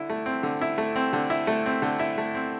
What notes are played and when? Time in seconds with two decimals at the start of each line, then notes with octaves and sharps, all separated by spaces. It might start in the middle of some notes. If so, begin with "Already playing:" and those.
Already playing: D3 E4
0.10 A3
0.26 C4
0.43 D3
0.61 E4
0.78 A3
0.96 C4
1.13 D3
1.30 E4
1.47 A3
1.66 C4
1.82 D3
1.99 E4
2.18 A3
2.35 C4